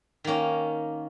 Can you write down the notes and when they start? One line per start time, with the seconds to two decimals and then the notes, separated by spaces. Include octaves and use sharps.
0.24 D#3 A#3 C#4